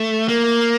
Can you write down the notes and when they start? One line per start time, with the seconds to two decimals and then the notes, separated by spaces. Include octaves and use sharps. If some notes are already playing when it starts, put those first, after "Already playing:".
Already playing: A3
0.28 A#3